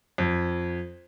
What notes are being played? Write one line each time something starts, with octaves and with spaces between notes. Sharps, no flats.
F2